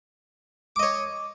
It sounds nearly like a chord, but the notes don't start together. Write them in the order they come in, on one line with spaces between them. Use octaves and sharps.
D6 D#5 C#5